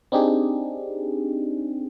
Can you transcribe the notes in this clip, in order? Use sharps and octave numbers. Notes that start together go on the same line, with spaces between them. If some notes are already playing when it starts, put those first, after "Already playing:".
C4 D4 D#4 G4 G#4